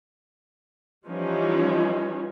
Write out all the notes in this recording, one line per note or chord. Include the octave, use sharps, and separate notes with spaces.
E3 F3 G3 C#4 D#4